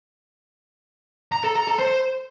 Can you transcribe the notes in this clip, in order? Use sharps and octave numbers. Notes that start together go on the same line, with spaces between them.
A#5
A4
A#5
A4
C5